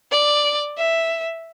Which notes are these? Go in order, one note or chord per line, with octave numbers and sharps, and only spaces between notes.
D5
E5